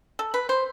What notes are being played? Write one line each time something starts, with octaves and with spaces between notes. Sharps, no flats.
A4
B4
C5